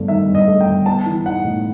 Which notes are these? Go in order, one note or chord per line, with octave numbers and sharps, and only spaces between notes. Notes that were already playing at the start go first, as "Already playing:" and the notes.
Already playing: G1 G2 A3
D#3 E5
G2
D#5
A3
G5
G1
B3 A5
E3
D#4 F#5
A2